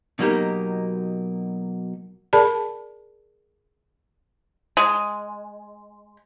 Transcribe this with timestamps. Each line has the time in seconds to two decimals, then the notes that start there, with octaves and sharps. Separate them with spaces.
0.19 B2 F#3 A#3 D#4 G4 A#4
2.33 G#4 A#4 D5 A5 B5
4.77 G#3